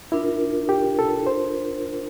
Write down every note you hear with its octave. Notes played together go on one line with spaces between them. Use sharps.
D4 E4 F4 A#4
G4
A4
C5